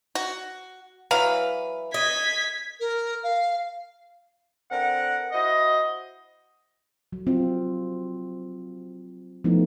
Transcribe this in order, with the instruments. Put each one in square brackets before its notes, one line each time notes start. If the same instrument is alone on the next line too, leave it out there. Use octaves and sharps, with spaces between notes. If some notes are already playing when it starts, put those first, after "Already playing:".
[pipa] F#4
[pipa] E3 F#3 F5 [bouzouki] B4
[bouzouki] D#5 [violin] G#6 B6
[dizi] A#4
F5
[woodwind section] D3 C4 A#4 F#5
E4 F#4 C5 D#5
[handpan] F#3
C4 F4
F3 A3 B3 D#4 E4